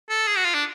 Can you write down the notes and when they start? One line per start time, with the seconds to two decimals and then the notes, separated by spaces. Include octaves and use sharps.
0.09 A4
0.27 G#4
0.37 F#4
0.45 F4
0.54 D4